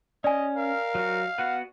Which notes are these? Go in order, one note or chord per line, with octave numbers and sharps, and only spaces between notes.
C#4 D5 D#5 G#5
A#4 F5
F#3 F#4
B3 F#4 B4 F#5